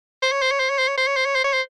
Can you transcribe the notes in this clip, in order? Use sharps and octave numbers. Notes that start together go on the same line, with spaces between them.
C5
C#5
C5
C#5
C5
C#5
C5
C#5
C5
C#5
C5
C#5
C5
C#5
C5